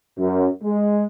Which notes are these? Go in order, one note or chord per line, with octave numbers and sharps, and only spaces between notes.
F#2
G#3